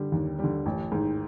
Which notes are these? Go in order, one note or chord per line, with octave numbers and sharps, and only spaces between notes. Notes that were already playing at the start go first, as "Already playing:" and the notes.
Already playing: D3 G3
D#2
D3 G3
A1
G#2 D#3